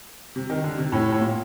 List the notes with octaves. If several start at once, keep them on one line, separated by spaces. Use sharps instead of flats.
C3
D#3
D3
C3
A2
A2
A#2